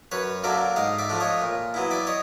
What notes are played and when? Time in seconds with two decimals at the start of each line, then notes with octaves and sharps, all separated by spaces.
0.12 F#2 B4 C#5
0.44 D3 F#3 A#3 D5 E5
0.76 G#2 D#5 F5
0.99 D5 E5
1.09 F3 A3 D4
1.20 C#5 D#5
1.42 A#2
1.74 F#3 B3 E4
1.91 D5 E5
2.07 C#5 D#5